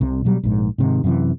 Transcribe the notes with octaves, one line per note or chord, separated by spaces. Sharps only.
C2 C3
B2 F#3 G3
A#1 G#2
G#2 C3 D#3
F#2 C3 E3